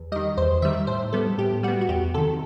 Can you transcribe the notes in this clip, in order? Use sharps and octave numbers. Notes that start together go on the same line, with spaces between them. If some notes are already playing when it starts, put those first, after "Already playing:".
Already playing: E2
D#3 G3 D#5
E2 C5
D#3 G3 E5
A2 C5
G3 B3 A4
A2 G4
G3 B3 F#4
F#4
E2 G4
C3 D#3 A4